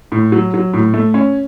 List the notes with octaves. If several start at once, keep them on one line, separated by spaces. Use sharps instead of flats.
A2
F#3
F#3
A2
A3
C#4